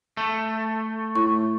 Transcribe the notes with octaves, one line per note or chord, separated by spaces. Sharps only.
A3
A2 C#6